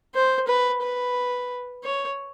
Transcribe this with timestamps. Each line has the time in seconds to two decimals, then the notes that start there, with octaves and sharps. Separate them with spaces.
0.15 C5
0.48 B4
0.82 B4
1.84 C#5